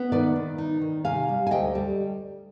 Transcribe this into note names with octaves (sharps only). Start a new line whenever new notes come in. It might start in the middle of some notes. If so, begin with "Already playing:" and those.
Already playing: B3
D#3 B4 D5
D#3
D#4
D#3
C3 F5 G#5
G3
G#5
D2 D#5 G5
G3